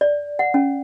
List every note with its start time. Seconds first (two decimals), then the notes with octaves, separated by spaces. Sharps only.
0.01 D5
0.39 F#5
0.54 C#4